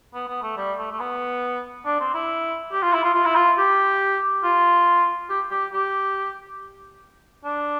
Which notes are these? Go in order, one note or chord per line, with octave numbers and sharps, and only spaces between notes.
B3
B3
A3
G3
A3
A3
B3
D4
C4
E4
G4
F4
E4
F4
F4
E4
F4
G4
F4
G4
G4
G4
D4